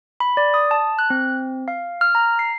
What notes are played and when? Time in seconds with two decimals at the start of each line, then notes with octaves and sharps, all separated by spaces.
0.20 B5
0.37 D5
0.54 D#6
0.71 A5
0.99 F#6
1.10 C4
1.68 F5
2.01 F6
2.15 A#5
2.39 C7